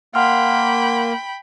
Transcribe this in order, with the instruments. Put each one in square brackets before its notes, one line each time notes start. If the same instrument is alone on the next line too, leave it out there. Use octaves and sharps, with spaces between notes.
[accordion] A#3 [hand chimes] F#5 C6 F6 [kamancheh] G5 B5